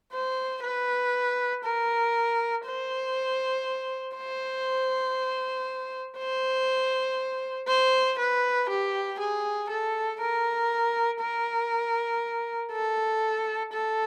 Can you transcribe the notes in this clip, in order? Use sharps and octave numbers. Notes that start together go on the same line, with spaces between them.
C5
B4
A#4
C5
C5
C5
C5
B4
G4
G#4
A4
A#4
A#4
A4
A4